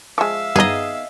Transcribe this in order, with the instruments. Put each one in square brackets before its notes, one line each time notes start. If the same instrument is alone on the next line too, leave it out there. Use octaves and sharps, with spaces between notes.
[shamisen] F3 G#3 [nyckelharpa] E5 F5 [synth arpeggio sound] C#6
[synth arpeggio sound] G2 [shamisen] B3 D#4 [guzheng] G#4 D#5